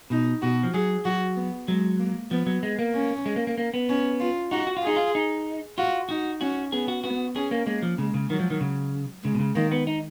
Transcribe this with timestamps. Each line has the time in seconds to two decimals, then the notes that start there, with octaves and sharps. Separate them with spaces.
0.10 B2 D#4
0.42 B2 F#4
0.63 F3
0.73 F#3 G#4
1.05 F#3 F#4
1.36 B3
1.68 F#3 G#3
2.00 A#3
2.31 F3 B3
2.46 F#3
2.63 G#3
2.79 A#3
2.94 C#4
3.26 G#3
3.36 A#3
3.47 A#3
3.58 A#3
3.74 B3
3.89 C#4
4.20 F4
4.51 D#4 F#4
4.67 F#4
4.77 F4
4.83 D#4 G#4
4.96 F4
5.15 D#4
5.78 F4 F#4
6.09 D#4 F#4
6.41 C#4 F#4
6.72 B3 G#4
6.88 F#4
7.04 B3 F#4
7.35 C#4 G#4
7.51 A#3
7.66 G#3 A#3
7.82 F3
7.98 C#3 G#3
8.14 C#3
8.30 D#3 F#3
8.40 F3
8.50 D#3
8.61 C#3
9.24 C#3 G#3
9.35 B2
9.39 C#3
9.55 D#3 A#3
9.72 B3
9.87 D#4